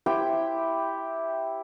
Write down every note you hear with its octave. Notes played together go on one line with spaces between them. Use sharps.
E4 G4 C5 G5